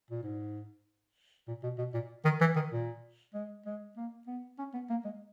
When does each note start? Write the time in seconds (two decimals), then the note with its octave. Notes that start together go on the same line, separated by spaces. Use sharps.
0.11 A#2
0.23 G#2
1.48 A#2
1.63 B2
1.78 B2
1.94 A#2
2.25 D#3
2.40 E3
2.56 D#3
2.72 A#2
3.34 G#3
3.66 G#3
3.97 A#3
4.27 B3
4.59 C#4
4.74 B3
4.90 A#3
5.05 G#3